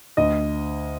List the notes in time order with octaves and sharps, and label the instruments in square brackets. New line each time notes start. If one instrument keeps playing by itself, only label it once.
[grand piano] D2 D#5